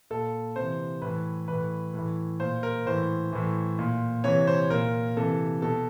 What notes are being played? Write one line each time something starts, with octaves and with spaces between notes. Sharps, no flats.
A#2 A4
C3 E3 C5
A2 E3 B4
A2 E3 B4
A2 E3
A#2 C5
A#4
A2 E3 C5
A2 E3
A#2
C3 E3 C#5
C5
A#2 A#4
C3 E3 A4
B2 A4